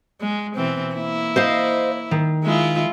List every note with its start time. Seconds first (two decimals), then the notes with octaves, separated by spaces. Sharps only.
0.21 G#3
0.56 B2 E3 C4
0.93 A#3 E4
1.36 C5 D#5 F5
2.11 D#3
2.43 G#3 E4 F4